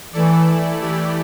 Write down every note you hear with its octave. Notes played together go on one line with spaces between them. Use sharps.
E3 A3 E4 A4 D5
E3 A3 E4 G4 D5